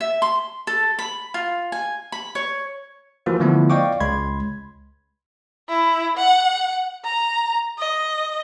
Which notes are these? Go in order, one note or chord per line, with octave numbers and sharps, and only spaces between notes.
E5
C6
A4
B5
F4
G#5
B5
C#5
E3 F3 A#3 F4 F#4
D3 F3 A3 B3 E4
D5 D#5 F5 G5 C#6 D6
C#2 G#3 B5 C6 G#6
E4
F#5
A#5
D#5